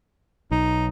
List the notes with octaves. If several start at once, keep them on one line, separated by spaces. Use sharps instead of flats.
B1 D#4